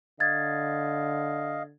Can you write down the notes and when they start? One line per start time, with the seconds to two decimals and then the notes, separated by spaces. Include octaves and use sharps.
0.20 D3 D#5 F5 G#6 A6